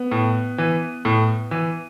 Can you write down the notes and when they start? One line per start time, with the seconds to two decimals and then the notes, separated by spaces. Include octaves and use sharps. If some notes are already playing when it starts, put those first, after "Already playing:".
Already playing: B3
0.11 A2
0.58 E3
1.05 A2
1.51 E3